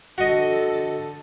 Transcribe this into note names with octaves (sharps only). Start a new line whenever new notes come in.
D3 F#4 A4 D#5